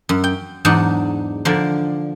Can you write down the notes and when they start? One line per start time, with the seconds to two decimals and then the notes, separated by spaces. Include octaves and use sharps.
0.09 F#2
0.24 G5
0.65 E2 G#2 F#3 D4 D#4 D5
1.45 D3 F3 A#4 D5